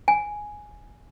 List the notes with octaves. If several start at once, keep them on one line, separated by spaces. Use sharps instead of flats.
G#5